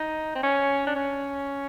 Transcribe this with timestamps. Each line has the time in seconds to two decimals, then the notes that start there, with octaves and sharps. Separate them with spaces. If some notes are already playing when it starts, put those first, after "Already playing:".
Already playing: D#4
0.35 C4
0.43 C#4
0.87 D4
0.96 C#4